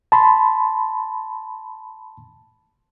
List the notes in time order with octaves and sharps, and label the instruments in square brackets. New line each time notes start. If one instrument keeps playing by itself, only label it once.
[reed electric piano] A5 B5 C6